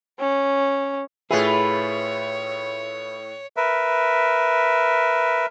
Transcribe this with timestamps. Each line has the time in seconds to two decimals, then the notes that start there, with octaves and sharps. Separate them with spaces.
0.19 C#4
1.31 A2 E4 F4 G#4 B4 C#5 E5
3.57 A#4 B4 E5